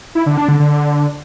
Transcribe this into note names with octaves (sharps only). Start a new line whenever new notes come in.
E4
D3
D4
D3
D3